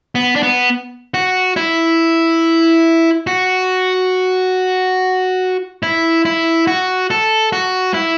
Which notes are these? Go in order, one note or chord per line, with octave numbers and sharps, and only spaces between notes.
B3
D4
B3
F#4
E4
F#4
E4
E4
F#4
A4
F#4
E4